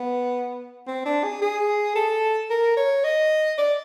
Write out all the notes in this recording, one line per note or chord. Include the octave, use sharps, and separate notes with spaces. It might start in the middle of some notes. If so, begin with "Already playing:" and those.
Already playing: B3
C4
D4
G#4
G#4
A4
A#4
C#5
D#5
D5